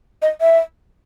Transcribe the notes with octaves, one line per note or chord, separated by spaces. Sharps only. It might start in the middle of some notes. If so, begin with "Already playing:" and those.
D#5
E5